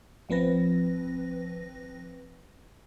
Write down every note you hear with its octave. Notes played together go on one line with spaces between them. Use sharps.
G#1 F3 C4 B4 A#6